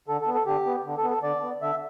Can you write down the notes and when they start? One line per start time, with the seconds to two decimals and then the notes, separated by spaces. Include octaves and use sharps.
0.08 D3 A4
0.21 A4
0.27 B3
0.34 A4
0.46 D3 G4
0.66 B3
0.85 D3
0.97 A4
1.03 B3
1.10 A4
1.23 D3 D5
1.42 B3
1.61 D3 E5